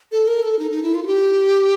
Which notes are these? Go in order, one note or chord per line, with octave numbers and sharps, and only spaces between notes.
A4
A#4
A4
D#4
D#4
E4
F4
F#4
G4